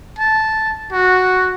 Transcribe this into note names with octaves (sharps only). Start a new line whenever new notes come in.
A5
F#4